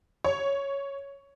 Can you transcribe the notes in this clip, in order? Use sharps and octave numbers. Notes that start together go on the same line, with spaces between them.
C#5